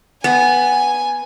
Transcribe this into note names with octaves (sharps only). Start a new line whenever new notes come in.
B3 G#5